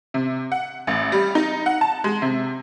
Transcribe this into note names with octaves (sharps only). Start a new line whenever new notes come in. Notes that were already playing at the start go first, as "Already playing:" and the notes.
C3
F#5
A1
G3
D#4
F#5
A5
G#3
C3